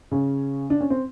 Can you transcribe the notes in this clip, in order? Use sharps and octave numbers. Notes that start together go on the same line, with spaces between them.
C#3 C#4
D4
C#4
C4